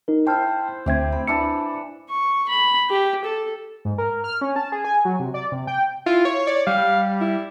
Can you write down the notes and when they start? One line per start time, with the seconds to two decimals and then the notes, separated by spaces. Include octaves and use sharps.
0.08 D#4 A#4
0.27 E4 C5 G5 A5 F6
0.86 D2 C3 C4 E5 G#6
1.12 B5
1.27 E3 D4 E5 A5 B5 C#7
2.09 C#6
2.49 B5
2.90 G4
3.24 A4
3.85 G#2
3.98 A#4
4.24 F6
4.41 C#4
4.56 A5
4.72 G#4
4.85 G#5
5.05 F#3
5.19 C3
5.34 D5
5.52 C3
5.67 G5
6.06 E4 F4
6.25 C#5
6.47 C#5 D5
6.67 G3 F5
7.21 E4